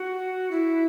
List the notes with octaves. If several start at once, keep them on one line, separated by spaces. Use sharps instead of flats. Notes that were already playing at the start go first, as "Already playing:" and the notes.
Already playing: F#4
E4